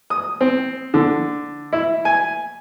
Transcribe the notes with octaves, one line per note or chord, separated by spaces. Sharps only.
D#6
C4
D3
E4
G#5